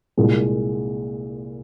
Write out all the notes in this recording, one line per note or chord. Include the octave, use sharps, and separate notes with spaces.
C2 A#2 G#3